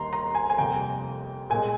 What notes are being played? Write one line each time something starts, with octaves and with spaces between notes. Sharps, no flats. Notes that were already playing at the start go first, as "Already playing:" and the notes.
Already playing: D#2 D#3 G3 A#3 A#5 C6
A#5
G#5
G#5
F2 C3 G3 A#3 G5
A#2 G#3 G#5